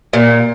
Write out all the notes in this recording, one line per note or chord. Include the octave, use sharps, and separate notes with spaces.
A#2